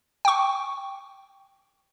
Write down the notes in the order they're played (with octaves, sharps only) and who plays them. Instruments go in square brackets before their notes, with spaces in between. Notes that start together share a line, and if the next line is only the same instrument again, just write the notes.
[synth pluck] G5 C#6